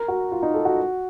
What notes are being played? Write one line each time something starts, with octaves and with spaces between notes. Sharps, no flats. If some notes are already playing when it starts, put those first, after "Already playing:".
Already playing: A#4
F#4
F4
D#4
A4
F#4